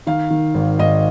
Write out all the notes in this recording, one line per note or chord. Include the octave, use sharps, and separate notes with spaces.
D#3 F5
D#3
G#1
G#1 D#5